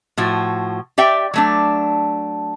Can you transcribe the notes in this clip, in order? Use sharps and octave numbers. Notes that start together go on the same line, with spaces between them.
A2 F3 F#4
G4 D5 E5 G5
F#3 A3 D4